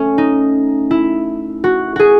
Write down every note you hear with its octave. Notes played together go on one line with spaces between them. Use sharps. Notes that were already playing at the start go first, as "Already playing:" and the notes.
Already playing: A3 C#4
D#4
E4
F#4
F#4 G#4